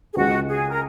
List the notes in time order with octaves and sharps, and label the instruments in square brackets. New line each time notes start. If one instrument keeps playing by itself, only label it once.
[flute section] G#4
[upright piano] C#2 C#3 G#3 [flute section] F#4
[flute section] G#4
A#4